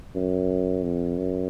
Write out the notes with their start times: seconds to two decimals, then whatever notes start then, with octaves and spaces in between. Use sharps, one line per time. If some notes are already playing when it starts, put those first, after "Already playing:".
0.15 F#2
0.83 F2
1.18 F#2